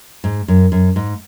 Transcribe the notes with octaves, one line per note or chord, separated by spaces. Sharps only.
G#2
F#2
F#2
G#2